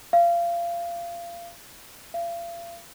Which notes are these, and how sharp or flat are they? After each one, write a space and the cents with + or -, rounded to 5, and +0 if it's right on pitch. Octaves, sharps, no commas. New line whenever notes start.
F5 -25
F5 -40